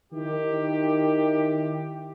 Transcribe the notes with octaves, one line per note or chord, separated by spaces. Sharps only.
D#3 E4 G4